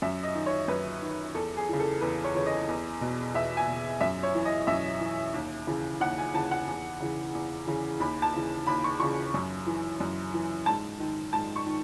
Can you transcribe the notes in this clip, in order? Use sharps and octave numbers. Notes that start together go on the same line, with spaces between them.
F#2 E5
D#5
D#3
C#5
F#2 B4
D#3
E2 A4
G#4
C#3 E3
A4
E2 B4
C#5
C#3 E3 C#5
D#5
E2
B2
E2 E5
G#5
B2
F#2 E5
C#5
E3
D#5
F#2 E5
E3
D#2
C#3 E3
D#2 F#5
G#5
C#3 E3 A5
F#5
E2
C#3 E3
E2
C#3 E3
D#2 B5
A5
C#3 E3
D#2 B5
C#6
C#3 E3 C#6
F#2
E3
F#2
E3
G#2 A5
D#3
G#2 A5
C#6
D#3